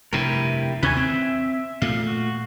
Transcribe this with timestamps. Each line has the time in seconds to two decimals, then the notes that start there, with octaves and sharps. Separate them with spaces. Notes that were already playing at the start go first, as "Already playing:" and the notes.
0.13 F1 G2 C3 E4 G4 A#4
0.83 D#2 C3 B4 C#5 G#5
0.97 C4 E5
1.82 A#2 A3 F5
2.07 F#4